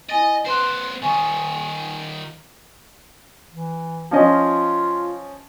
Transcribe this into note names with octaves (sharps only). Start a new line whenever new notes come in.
E4 D#5 G#5 A6
B3 B4 C5 C6 F#6
D#3 F4 G#5 C#6
E3
F3 C#4 F4 D#5